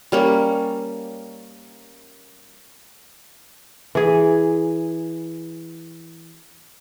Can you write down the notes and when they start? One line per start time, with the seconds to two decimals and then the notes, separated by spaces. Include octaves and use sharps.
0.12 G3 A#3 C#4
3.95 E3 G#4